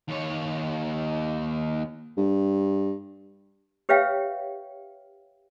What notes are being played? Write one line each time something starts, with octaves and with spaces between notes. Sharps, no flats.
D#2 C#5
G2
G4 B4 C#5 E5 F5 G5